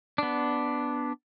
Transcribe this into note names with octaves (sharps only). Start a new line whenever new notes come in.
B3 D4